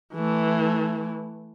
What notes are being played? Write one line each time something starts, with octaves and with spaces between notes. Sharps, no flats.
E3 A3